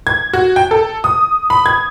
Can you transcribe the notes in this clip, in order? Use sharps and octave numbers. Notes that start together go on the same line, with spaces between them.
G#6
F#4
G5
A4
D#6
B5
G#6